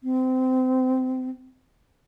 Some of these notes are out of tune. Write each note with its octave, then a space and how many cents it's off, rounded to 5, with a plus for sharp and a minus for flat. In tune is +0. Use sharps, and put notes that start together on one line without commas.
C4 -25